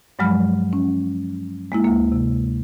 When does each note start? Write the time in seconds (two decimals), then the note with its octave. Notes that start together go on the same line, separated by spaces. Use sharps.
0.19 G2 F3 F#3 G#3 B5 F6
0.73 C#4
1.72 G#3 A#3 E4
1.84 D2 A#3
2.12 C3